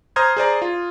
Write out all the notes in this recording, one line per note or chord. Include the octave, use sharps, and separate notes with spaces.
C5 A#5 C6 D#6 F6 G#6
G#4 C5 D5 A#5
F4